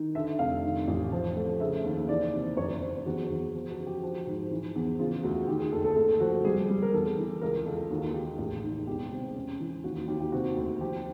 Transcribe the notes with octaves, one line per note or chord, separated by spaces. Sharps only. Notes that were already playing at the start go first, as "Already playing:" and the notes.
Already playing: D#3
D3 E5
F1 F5
D#3
A1
F3
A3
C#3 E5
D#2
E3 D5
C3
F#2 C#5
F#2 C5
E2 F#4
E2
F3
F#4
C#3
G4
F3 F#4
G#2
E3
E2
C#3 F4
D2 F#4
D#3 G4
G#4
F#1 A4
A4
A3 A4
F3 F#4
G3 G#4
G3
A#4
E2 A4
E3
C#2 A#4
C#2 A4
D#2 F#4
D#2 G4
A1 G#4
D#3
E1 G4
C3
C#4
E3
D#2 F#4
F#4
D#2 G4
G4
C3 F#4
D2
F3 G4